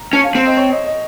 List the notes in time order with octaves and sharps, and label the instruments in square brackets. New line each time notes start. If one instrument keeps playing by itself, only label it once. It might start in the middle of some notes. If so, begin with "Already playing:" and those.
Already playing: [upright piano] A#5
[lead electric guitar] C#4 [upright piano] A5
[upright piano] F5
[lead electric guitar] C4 [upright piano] F5
[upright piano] D#5
C#5
D#5
D#5